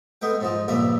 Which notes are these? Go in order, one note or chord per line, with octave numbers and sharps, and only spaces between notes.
G#3 A3 B3 G5
G#2 F3 G#3
A#1 G2 C#3 A#3 E5 B5